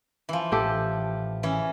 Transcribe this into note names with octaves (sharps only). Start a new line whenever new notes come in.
E3 F3
A1 G4 A4 G5
E3 C#4